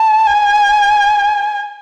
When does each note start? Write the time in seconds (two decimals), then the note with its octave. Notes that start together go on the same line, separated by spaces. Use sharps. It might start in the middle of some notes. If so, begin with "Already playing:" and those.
Already playing: A5
0.27 G#5